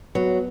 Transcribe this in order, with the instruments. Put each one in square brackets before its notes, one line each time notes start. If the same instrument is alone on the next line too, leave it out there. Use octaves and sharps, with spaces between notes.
[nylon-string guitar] F#3 [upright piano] B3